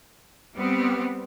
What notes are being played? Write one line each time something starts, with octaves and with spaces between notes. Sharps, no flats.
G3 B3 C4